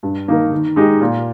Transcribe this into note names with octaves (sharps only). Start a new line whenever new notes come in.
G2
D#3 A#3 D#4 A#4
D#3
G#3 D#4 G4
A#2